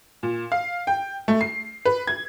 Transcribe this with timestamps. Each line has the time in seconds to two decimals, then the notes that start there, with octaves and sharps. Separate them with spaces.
0.23 A#2
0.52 F5
0.87 G5
1.28 A3
1.41 C7
1.85 B4
2.07 G#6